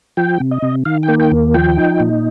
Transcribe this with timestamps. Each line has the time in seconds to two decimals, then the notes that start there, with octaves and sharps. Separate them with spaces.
0.17 F3 G5
0.40 C3
0.51 D#5
0.62 C3
0.85 D#3 F5
1.03 G5
1.08 A#3
1.20 G5
1.31 D#2
1.54 F3 G5
1.77 D#4
2.00 A#2